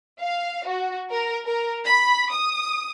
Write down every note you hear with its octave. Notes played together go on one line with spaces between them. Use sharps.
F5
F#4
A#4
A#4
B5
D#6